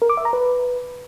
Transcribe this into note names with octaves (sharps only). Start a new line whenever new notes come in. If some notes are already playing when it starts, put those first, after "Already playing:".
A#4
D6
E5
A#5
B4